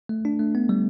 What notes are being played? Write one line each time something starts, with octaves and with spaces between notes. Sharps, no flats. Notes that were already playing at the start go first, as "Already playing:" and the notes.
A3
D4
A3
B3
G3